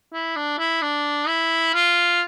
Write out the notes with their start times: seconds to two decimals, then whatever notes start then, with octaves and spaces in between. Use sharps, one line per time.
0.13 E4
0.36 D4
0.58 E4
0.82 D4
1.28 E4
1.74 F4